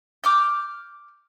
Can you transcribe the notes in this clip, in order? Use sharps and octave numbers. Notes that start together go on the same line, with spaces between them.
D6 F6 G6